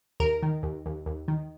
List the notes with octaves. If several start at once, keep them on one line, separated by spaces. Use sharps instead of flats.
D#2 A#4
D#3
D#2
D#2
D#2
D#3